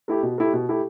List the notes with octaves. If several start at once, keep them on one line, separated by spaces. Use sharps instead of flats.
A3 E4 G4
B2
A3 E4 G4
B2
A3 E4 G4